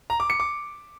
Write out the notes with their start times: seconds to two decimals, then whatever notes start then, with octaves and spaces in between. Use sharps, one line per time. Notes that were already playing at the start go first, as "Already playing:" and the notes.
0.10 A#5
0.20 D6
0.30 C#7
0.40 D6